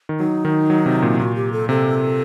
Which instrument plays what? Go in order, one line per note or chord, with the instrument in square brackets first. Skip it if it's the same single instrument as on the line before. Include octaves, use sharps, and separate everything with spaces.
[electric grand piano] D#3
[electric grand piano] F#3 [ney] D#4
[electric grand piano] D#3
F#3
C3
A#2
[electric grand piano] A#2 [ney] F#4
[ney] G4
A4
[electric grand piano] C3 [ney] A4